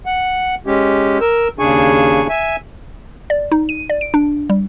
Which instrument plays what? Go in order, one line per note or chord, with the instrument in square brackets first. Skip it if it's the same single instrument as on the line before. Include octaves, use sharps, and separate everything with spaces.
[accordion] F#5
G#3 C#4 G4
A#4 E6
D#2 C#3 D4 G#4 G#5 C#6
E5 G#5
[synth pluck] D5
D#4
D#7
D5
D7
D4
G3